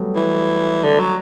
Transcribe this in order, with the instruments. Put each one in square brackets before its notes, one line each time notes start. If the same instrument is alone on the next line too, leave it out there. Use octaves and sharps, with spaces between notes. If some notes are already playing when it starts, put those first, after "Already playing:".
Already playing: [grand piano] F#3 G3 A3 B3
[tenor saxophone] E3
D3
F#3